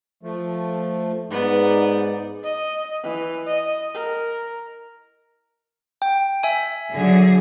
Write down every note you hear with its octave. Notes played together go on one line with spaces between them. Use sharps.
F3 A3
G#2 B3 D#4 D5
D#5
E3
D#5
A#4
G5
E5 G#5
D3 F#3 G#4